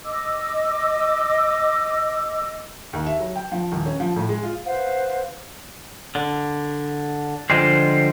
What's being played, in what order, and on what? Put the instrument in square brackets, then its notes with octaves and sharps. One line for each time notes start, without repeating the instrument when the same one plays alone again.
[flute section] D#5 D6 E6
[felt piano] D#2
E5
F#3
G5
F3
D#1
C#4
F3
A2
G#3
F4
[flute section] B4 C5 F5 F#5
[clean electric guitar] D3
[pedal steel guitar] D3 C5 [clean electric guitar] F3 G3 G#3